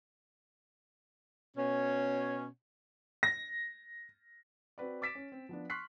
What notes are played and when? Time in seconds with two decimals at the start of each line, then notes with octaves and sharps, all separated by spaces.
1.57 B2 C#4
3.23 A#6
4.78 C4 F#4 B4 D5
5.02 D6 A6 B6 D7 E7
5.15 C#4
5.32 C4
5.49 F3 B3 D4
5.70 C6 C#6 F6 F#6 B6 C7